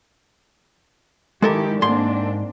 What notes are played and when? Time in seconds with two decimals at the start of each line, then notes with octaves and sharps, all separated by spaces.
1.42 D#3 G#3 E4 G4 A4 A#4
1.82 G#2 A#3 C4 D4 C6